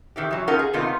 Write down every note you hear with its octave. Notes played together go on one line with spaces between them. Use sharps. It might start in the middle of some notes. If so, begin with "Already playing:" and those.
D#3 E3 G4
E3 F#3
B3 C#4 D#4 F4 A#4 F#5
G#4
A2 C3 D#3 G3 B3 F4